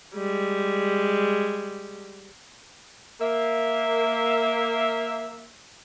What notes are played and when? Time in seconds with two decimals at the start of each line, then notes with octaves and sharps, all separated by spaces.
0.14 G3 G#3
3.21 A#3 E5